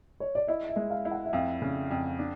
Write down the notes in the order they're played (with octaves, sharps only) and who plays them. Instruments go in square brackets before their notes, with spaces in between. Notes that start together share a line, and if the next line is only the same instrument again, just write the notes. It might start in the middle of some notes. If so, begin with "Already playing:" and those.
[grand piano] C#5
D5
[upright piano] E4 [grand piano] D#5
[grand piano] E5
[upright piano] G#3
[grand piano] F5
[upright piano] E4
[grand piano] F#5
E5
[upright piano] F2 [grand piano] F5
[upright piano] C#3
F2
D4